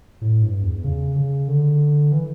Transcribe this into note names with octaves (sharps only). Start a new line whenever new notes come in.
A2
G2
E2
C#3
C#3
D3
E3